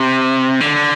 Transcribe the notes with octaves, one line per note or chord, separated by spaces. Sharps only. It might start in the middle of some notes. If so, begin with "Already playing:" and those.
Already playing: C3
D3